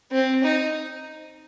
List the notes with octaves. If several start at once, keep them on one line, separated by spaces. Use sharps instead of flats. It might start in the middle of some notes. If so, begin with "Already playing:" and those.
C4
D#4